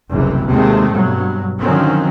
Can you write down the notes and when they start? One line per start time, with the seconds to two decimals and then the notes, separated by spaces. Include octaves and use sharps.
0.11 F#1 C2 C3 E3
0.48 D#2 C3 G#3 A3 C4
0.91 G2 B2 F#3
1.61 D3 D#3 F3 F#3 C4 C#4